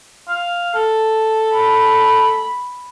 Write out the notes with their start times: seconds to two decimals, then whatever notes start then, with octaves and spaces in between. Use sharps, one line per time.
0.29 F5
0.74 A4
1.53 B5